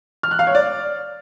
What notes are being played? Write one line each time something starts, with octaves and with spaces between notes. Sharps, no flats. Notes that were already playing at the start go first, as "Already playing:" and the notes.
F6
F#6
F5
C#5
D5